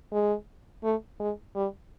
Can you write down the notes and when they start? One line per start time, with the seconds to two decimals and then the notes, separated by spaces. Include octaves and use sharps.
0.12 G#3
0.83 A3
1.20 G#3
1.55 G3